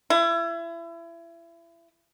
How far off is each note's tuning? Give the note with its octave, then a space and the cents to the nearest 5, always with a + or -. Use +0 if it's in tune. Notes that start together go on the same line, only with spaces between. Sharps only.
E4 +30